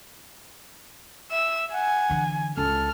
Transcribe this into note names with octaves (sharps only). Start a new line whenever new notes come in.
E5 E6
F#5 G#5
D3 E3
C#2 A4 F6